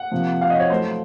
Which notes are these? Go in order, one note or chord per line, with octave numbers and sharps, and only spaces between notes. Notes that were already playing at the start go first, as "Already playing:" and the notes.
Already playing: F#5
C3 F3 A#3
F5
D#5
C#5
A2 F#3 A3 C5